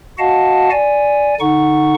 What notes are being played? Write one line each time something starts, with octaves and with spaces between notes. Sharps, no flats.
F#4 D#5 F5 F#5 A5
D5 G#5
D3 D#4 F#5 C#6